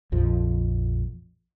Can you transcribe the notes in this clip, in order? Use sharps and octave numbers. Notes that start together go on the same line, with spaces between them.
A#1 F2 F3